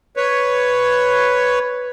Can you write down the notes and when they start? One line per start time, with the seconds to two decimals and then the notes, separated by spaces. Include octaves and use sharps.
0.17 B4 C#5